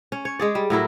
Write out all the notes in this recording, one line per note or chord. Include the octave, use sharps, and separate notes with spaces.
C#4
C#5
G#3 G#4 D5
G3
A2 F#3 E4 A#4